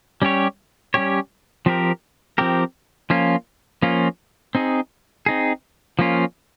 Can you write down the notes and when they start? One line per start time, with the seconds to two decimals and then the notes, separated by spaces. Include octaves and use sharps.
0.22 G3 C#4 G4 C#5
0.94 G3 C#4 G4 C#5
1.66 F3 C4 G4 A#4
2.38 F3 C4 G4 A#4
3.10 F3 A#3 C#4 F4
3.82 F3 A#3 C#4 F4
4.55 C4 D#4 G#4
5.26 C4 D#4 G#4
5.99 F3 A#3 C#4 F4